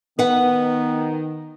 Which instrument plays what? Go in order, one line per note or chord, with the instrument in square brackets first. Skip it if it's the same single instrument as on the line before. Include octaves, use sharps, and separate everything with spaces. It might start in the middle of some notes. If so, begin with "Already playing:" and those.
[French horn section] D#3 [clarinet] B3 [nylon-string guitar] B4 F#5